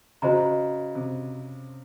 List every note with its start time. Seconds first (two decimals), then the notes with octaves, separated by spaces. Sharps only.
0.22 C#3 F#4 C5 D#5 A#5
0.95 C3